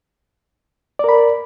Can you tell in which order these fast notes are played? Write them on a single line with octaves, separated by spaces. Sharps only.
D5 A#4 B5